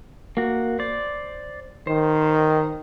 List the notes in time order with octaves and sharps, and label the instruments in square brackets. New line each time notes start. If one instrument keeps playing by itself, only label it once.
[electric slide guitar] A#3 F#4
C5 D5
[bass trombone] D#3 [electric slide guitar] C5